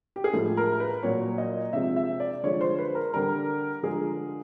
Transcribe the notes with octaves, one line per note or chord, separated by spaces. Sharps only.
G4
G#4
A2 F3 G#3 A4
A#4
B4
A#2 F#3 C#5
D#5
C3 F3 G#3 E5
E5
D5
D3 F3 G#3 C#5
C5
B4
A#4
D3 G3 A#4
D3 F3 G#3 G#4